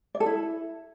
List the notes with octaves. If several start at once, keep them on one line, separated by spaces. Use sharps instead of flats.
D5
A4
E4